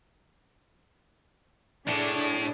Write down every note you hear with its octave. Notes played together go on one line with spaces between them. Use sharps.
A2 D4 G#4